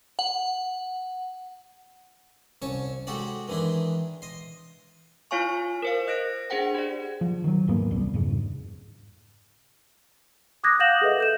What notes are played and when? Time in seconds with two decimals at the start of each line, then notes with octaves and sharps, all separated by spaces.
0.19 F#5
2.62 C2 C#4 A5 C#6
3.07 G#3 F#4 G4 A4 D5
3.48 D#3 E3 G#3 D4 E4
4.22 D#5 C6
5.31 E4 F4 C#5 F5 G#5 C#6
5.82 A#4 C5 F5
6.07 D#5 F#6 A#6 D7
6.50 D4 G#4 C5 F#5 G5
6.75 G4 D5
7.21 F3
7.44 D#3 F#3
7.67 D#2 G#2 A#3 B3
7.91 C2 G3
8.14 F2 G#2 C#3
10.64 D6 D#6 F#6 G#6 A#6
10.79 F5 F#5 G6 A#6 E7 F#7
11.02 G#4 A4 B4 D#5 E5
11.18 A4 G6 E7